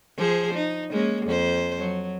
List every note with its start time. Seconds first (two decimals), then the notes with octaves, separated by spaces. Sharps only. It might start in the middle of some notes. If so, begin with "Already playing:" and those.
0.17 F3 G#4 C5
0.54 D#4
0.91 G#3 A#3 C#4
1.25 F2 C5
1.78 F#3